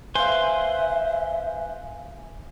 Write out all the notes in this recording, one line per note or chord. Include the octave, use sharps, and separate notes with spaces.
B4 C5 E5 F5 G#5 C6